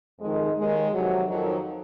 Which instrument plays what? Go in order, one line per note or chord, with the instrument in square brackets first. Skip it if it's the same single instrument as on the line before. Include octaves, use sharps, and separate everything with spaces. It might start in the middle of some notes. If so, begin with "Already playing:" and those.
[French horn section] F2 D#3 G#3
D#2 D#3 G#3
F2 C3 D#3 F#3
F2 D#3 F#3